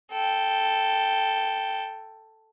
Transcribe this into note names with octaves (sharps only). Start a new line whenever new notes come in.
A4 G5